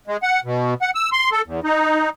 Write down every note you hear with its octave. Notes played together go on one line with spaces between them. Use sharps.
G#3
F#5
B2
F#5
E6
C6
A4
E2
D#4